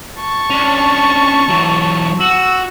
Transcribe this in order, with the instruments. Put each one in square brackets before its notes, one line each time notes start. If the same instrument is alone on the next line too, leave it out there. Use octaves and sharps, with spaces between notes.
[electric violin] A5 C#6
[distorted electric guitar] C#4 D4
E3 F#3
[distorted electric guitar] F#4 [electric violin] E6